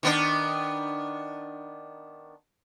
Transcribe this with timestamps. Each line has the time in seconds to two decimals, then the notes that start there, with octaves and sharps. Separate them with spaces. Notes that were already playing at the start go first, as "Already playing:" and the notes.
0.03 D#3 B3 D4